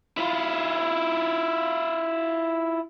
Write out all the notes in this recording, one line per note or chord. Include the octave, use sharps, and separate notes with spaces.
E4 F4